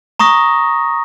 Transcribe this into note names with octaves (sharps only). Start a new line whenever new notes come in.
A#5 C#6 D#6 A#6